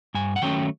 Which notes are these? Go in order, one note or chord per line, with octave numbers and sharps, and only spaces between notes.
G2 G#5
F#5
D#3 F#3 A3 C#4 G5